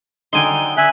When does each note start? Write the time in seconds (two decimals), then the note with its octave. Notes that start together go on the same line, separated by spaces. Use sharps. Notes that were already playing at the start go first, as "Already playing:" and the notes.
0.33 D3 F#3 D#4 G5 G#5 C6
0.77 D3 E5 G#5 F#6